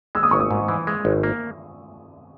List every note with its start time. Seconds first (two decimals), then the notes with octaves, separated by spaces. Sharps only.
0.15 G#3 E6
0.23 D#6
0.31 G#1 C#6
0.40 D#6
0.51 G#2
0.68 E3
0.87 G#3
1.05 G#1
1.23 A#3